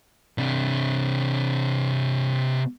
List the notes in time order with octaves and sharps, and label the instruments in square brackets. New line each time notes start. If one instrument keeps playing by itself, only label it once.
[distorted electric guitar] C3 D4